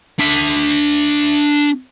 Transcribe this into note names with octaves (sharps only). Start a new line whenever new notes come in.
D4 E5